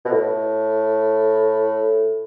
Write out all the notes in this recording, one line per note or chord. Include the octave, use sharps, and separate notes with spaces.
B2
A2